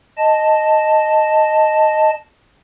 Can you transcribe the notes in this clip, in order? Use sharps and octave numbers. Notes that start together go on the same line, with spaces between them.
D#5 A5